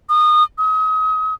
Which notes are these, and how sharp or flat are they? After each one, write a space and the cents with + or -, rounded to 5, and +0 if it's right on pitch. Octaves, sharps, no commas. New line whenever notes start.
D#6 -25
D#6 +35